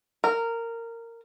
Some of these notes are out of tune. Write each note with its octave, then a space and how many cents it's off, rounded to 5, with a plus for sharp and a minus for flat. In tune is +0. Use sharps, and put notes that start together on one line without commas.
A#4 -15